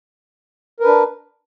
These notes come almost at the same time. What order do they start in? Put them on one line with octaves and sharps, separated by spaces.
A#4 B4 D4